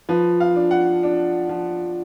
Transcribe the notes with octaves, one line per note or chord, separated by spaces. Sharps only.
F3 B4
F5
D4
F#5
D4
F3